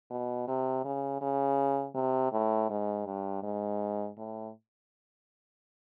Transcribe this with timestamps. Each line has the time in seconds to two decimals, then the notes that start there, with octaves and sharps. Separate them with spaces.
0.10 B2
0.48 C3
0.84 C#3
1.21 C#3
1.95 C3
2.32 A2
2.70 G#2
3.06 G2
3.43 G#2
4.17 A2